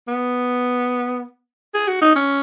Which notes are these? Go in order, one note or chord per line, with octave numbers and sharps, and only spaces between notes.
B3
G#4
F#4
D#4
C#4